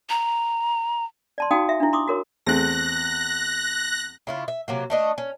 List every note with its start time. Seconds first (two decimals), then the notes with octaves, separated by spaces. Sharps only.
0.10 A#5
1.38 D5 A5 C6
1.51 D#4 F#4 F5 G5 A5 D#6
1.69 E5
1.80 D4 E4
1.93 C6 D6 D#6
2.08 F#4 A#4 C#5
2.46 E2 A3 C4 F#6 A#6
4.27 C#3 E4 F4
4.48 E5
4.68 C3 F#3 A#3
4.90 A3 D4 D#5
5.18 C#4